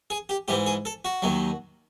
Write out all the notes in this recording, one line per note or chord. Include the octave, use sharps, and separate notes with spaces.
G#4
G4
G#2 E3 G4
G#4
A4
F#4
D#2 D#3 F#3